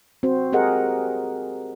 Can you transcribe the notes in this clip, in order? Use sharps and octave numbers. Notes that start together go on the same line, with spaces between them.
C4 F#4 C5
G4 G#4 A#4 D#5 F#5